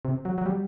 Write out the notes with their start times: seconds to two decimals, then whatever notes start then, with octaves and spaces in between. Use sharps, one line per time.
0.05 C3
0.25 F#3
0.38 F#3
0.46 G3